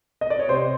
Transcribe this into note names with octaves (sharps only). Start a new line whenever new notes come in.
D#5
D5
C#5
C3 C5